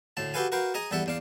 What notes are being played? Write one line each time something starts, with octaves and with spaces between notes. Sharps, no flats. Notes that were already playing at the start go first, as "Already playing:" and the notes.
D2 A2 A5
F#4 G4 A4 B4 F5 G#5
F#4 A#4 B4 F5 G5
G#4 D#5 G#5 A#5
E2 G3 A4 E5 F#5
E2 D4 F5